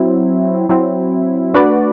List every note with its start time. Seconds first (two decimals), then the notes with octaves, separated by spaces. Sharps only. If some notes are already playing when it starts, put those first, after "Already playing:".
Already playing: F#3 C4 E4
0.69 F#3 C4 E4
1.54 A3 D4 F#4 B4 D5